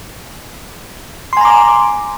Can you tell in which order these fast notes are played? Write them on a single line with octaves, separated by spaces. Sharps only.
C6 G#5 A#5 D6